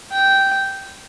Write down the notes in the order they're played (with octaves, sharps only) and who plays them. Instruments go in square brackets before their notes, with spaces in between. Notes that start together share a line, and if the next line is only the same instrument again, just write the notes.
[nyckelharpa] G5